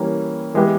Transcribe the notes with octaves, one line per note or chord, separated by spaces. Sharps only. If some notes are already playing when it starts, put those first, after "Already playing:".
Already playing: E3 G3 A#3 C#4
E3 G#3 B3 E4 G4